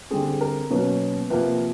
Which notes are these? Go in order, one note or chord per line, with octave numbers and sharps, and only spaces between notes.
D3 G3 C4 G#4
A#4
B2 F#3 A#3 C#4 B4
C3 F3 A#3 B4